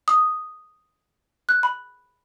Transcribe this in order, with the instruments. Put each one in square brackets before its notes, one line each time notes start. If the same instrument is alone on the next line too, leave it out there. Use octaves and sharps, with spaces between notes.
[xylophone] D#6
F#6
B5